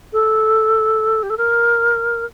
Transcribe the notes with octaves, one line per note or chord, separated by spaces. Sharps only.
A4
G4
A4
A#4